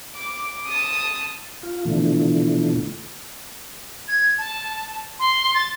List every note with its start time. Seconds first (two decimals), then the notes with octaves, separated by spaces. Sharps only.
0.15 D6
0.66 A5 D#6
1.63 F4
1.85 B2 D3 E3 F3 A3
4.08 G#6
4.38 A5
5.19 C6
5.54 A6